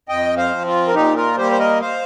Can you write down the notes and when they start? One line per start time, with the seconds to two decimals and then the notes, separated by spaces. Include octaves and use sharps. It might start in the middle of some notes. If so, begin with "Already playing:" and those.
0.09 F2 D#5 G5
0.37 C5 F5
0.52 F3 C4
0.66 F4
0.88 A#4
0.94 A#2 D#4 G4
1.16 F4 A#4
1.38 G3 A#3 G4 C5
1.52 C5
1.59 A#4 D#5
1.81 C5 F5